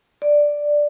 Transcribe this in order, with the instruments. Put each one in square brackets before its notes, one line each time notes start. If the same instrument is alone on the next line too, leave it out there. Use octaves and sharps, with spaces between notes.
[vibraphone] D5